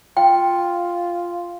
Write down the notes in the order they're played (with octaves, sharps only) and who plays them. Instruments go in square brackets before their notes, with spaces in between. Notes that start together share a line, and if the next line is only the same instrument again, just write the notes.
[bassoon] F4 [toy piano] G5